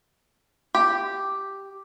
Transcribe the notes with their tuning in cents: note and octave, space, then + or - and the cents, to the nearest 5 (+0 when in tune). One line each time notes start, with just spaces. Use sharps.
G4 +0